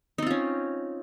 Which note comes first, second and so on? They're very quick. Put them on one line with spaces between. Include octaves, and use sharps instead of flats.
D#4 C4 F4 C#4